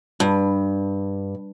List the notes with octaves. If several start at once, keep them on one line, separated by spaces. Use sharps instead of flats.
G2